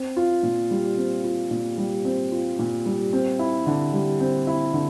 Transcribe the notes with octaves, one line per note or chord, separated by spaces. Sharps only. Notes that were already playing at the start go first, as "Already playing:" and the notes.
Already playing: C4
F4
A#2
G3
C4
F4
A#2
G3
C4
F4
A#2
G3
C4
E4
D3
G3
C4
E4
D3